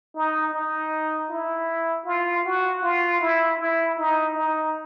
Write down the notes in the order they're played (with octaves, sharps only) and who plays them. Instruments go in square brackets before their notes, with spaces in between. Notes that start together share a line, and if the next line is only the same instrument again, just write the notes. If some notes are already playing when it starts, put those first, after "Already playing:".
[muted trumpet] D#4
D#4
E4
F4
F#4
F4
E4
E4
D#4
D#4